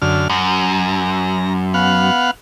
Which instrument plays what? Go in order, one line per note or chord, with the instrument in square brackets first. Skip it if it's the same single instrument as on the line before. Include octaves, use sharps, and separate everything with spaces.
[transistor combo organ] F#2 D3 F6
[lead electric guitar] F#2 [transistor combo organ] A#5
[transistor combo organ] B3 F5 F#5